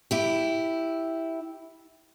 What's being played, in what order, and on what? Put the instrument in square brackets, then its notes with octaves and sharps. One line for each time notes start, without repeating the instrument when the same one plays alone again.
[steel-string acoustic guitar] E4 G4